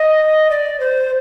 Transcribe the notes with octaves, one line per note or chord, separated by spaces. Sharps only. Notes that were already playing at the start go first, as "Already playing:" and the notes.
Already playing: D#5
D5
C5